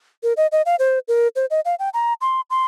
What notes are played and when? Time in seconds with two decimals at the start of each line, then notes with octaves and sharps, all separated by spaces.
0.23 A#4
0.37 D#5
0.52 D#5
0.66 F5
0.79 C5
1.08 A#4
1.36 C5
1.51 D#5
1.65 F5
1.79 G5
1.94 A#5
2.21 C6
2.50 C6